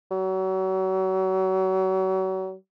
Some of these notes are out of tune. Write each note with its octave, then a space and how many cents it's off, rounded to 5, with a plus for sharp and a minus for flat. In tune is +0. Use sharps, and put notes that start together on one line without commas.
F#3 +35